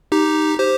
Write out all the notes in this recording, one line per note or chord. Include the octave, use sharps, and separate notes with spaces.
D#4 G4
G4 C5